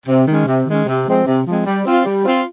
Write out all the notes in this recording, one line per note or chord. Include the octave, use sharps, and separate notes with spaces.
C3
D#3 G#3 C#4
C3
D#3 G#3 C#4
C3
F3 G#3 C4
C3
F3 G#3 C4
G3
C4 F4
G3
C4 F4